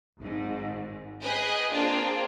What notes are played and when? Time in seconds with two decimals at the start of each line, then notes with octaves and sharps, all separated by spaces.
0.19 G#1 G#2
1.23 G#4 B4 D#5 G5 G#5
1.71 A#3 C4 D4 F4 G#4